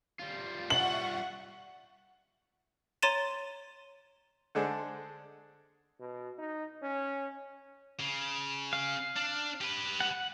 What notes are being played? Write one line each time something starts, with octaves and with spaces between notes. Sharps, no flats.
G3 F4
E5 F#5 C#6 F#7
C#5 A#5 C6 A6 D#7 E7
D3 G#3 D4 G#4 A4 C5
B2
D#4
C#4
C#3
F5
D4
G4 B4
F#5